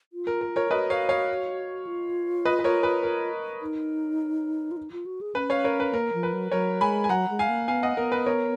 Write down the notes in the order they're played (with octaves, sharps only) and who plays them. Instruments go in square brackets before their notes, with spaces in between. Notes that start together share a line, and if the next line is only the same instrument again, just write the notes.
[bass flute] F4
[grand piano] A#4
A#4
A#4 C#5
[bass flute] F#4 [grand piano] B4 D#5
[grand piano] C#5 F5
C#5 F5
[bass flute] F4
[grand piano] B4 D#5
B4
A#4 C#5
B4
A#4
[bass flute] D#4
F4
D#4
F4
F#4
G#4
[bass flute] C#4 [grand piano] B4
[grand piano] C#5 F5
A#4 C#5
B4
[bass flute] A#3 [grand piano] A#4
[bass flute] F3
[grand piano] B4
[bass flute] F#3
[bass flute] F#3 [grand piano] A#4 C#5
[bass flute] G#3 [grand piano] G#5 B5
[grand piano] G#5
[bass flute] F#3 [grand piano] F#5 A#5
[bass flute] G#3
[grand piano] F5 G#5
[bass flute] A#3
[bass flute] B3 [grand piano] F5 G#5
[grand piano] D#5 F#5
[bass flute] B3 [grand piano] A#4
[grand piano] B4
A#4 C#5